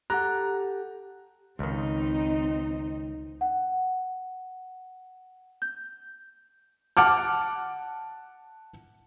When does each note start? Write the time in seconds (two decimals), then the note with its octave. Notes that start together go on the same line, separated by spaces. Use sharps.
0.10 G4 A4 F#5 A#5 F#6
1.59 C#2 D#3 C4 D#4
3.41 F#5
5.62 G6
6.97 F#5 A5 D6 F6